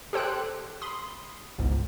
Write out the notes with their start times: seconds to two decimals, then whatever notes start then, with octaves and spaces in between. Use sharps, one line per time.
0.13 G4 A4 C5 G5 F#6
0.81 B5 C6 D#6
1.59 G1 C#2 G#2